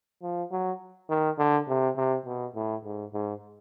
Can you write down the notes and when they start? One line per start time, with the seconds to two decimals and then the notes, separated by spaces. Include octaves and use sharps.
0.22 F3
0.51 F#3
1.09 D#3
1.38 D3
1.68 C3
1.97 C3
2.26 B2
2.55 A2
2.85 G#2
3.14 G#2